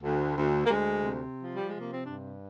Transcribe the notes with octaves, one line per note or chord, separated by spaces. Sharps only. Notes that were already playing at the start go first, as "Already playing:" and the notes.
D2
D2
A#3
D2 G#3
C3
F3
G3
C3 G#3
A#3
C4
G2 D4